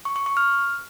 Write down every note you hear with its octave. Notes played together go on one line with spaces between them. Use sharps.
C#6
C#6
C#6
F6